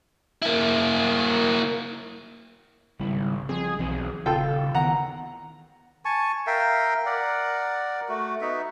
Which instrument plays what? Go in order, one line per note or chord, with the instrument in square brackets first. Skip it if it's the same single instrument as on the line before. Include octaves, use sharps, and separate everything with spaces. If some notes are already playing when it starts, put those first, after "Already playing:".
[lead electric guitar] A#3 E4
[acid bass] G#1 [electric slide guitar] C#3 G3 E4
[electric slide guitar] F3 C4 [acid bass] G#4
[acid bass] B1 [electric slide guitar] E3 C4 G#4
[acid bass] D#1 [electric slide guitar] C#3 [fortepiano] F4 A4 G5
[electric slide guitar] D#3 E3 B3 [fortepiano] F#5 A#5
[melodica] G#5 A5 C#6
A#4 E5 F5 G5
A#4 D5 F#5
A3 F#4
B3 D#4 F#4 E5